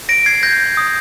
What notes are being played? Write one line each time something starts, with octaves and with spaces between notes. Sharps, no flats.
A#6 D7
G#6 C7
G6 A#6
D#6